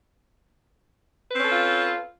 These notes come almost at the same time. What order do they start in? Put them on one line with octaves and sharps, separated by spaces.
B4 C4 C#4 A4 F4